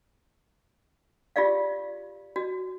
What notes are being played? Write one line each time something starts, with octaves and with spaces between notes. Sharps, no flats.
F4 G4 G#4 D5 F5
F#4